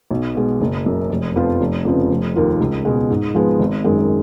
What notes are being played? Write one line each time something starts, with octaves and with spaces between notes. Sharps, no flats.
B1
B2 G#3
F#1
F#2 C#3
F1
F2 F3 B3 F4
F1
F2 C#3 F3 B3
F1
D#2 D#3 A#3 F4
C#2
B2 G#3
G#2
F3 G#3 B3
G#1
F#2 D#3 G#3